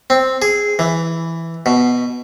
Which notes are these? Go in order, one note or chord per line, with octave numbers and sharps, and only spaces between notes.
C4
G#4
E3
B2